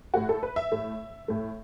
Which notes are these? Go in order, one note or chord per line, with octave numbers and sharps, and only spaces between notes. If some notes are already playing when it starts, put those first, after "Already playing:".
A2 A3 F#4
A4
B4
E5
A2 A3
A2 A3